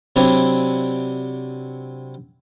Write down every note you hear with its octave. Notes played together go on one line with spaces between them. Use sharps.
C3 F#3 C4 D4 E4